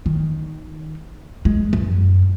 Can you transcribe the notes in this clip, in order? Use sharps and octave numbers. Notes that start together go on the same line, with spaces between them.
D#3
G#3
F#2